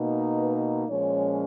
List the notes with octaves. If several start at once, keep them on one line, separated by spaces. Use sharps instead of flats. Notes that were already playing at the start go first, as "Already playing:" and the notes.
Already playing: B2 A#3 D#4
B4
A#2 F3 G#3 C#4 C#5